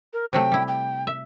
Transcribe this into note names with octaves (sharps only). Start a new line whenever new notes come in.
A#4
C3 F#3 A3 G5
G3 E4
G5
E5